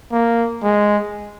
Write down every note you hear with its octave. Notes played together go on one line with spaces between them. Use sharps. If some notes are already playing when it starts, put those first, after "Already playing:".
A#3
G#3